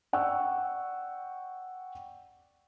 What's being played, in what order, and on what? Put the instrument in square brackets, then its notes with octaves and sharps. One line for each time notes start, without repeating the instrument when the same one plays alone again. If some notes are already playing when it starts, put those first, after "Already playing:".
[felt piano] D5 F#5 G5 C#6 E6